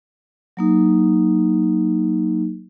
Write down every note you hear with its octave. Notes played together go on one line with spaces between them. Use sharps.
F#3 A#3 D#4